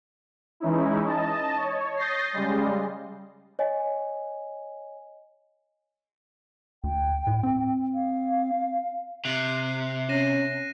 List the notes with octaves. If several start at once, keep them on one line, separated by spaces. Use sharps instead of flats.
E3 G#3 C#4 D#4 E4
D#5 A5
C#5
D#6 G6 A6 A#6 C7
C#3 G3 G#3
C#5 D#5 G#5
D2 G5
A2
C4
F5
C3 F#6 C7
C#4 A#6 D#7 E7